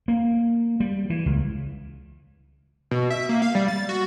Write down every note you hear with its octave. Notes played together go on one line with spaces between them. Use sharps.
A#3
G3
E3
C#2
B2
E5
A#3
F5
G3
A6
F#4